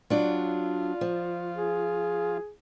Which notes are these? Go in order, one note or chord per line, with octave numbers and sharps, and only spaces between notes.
F#3 D4 F4
F3
G#4